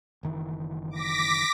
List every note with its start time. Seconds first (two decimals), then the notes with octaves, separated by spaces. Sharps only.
0.23 F#1 D#3 E3
0.91 D6 A#6 B6